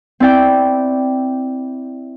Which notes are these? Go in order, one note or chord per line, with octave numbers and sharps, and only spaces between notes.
C4 E4 D5 G5